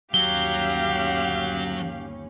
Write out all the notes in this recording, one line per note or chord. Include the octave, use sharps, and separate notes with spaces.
G1 D#2 F#3 C#4 G4 F5 G7